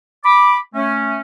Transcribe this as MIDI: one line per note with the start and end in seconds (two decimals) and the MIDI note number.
0.24 0.57 83
0.24 0.57 86
0.75 1.21 57
0.75 1.21 61